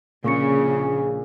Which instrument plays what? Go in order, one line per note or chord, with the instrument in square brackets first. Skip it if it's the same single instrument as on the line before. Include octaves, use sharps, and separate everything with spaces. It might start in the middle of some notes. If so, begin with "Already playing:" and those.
[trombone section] A#1 G#4 [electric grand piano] A#2 [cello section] C#3 [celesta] F4 C#6 C#7